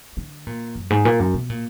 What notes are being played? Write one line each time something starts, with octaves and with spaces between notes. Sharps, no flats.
D3
A#2
F#2
G#2
A#2
F#2
B2
A#2